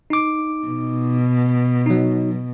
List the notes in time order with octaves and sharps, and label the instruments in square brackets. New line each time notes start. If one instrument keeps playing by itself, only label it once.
[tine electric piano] D#4 D6
[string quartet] B2
[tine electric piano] F#3 D#4